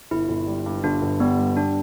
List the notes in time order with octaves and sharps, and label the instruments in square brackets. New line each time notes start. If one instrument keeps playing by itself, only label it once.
[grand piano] G1 [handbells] E4
[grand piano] G1
G3
G2
[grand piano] G1 [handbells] D4
[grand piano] G1
[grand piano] G3 [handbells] B3
[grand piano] G2
[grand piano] G3 [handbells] D4